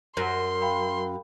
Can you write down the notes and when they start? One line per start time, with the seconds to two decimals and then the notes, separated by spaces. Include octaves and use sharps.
0.17 F#2 C6
0.62 F5 G5 B5